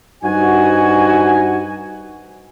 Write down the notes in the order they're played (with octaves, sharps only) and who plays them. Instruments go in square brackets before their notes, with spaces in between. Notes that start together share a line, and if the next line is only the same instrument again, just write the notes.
[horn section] G2 D#4 F#4 [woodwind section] C5 G#5